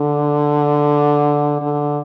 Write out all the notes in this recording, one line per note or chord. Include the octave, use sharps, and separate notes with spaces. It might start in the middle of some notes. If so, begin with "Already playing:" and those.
Already playing: D3
D3